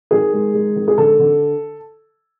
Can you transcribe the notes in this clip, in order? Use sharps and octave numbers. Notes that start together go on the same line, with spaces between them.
D#3 G#4
G#3
G#3
D#3
G#4
D3 A4
D3